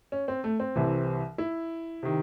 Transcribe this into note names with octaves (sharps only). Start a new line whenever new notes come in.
C#4
C4
A3
C4
C2 C3 E3
E4
C3 D#3